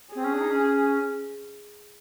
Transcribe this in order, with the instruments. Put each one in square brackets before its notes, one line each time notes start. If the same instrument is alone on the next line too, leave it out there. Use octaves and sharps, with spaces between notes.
[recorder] C4 [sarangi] G#4
[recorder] C#4
D4
D#4
C#4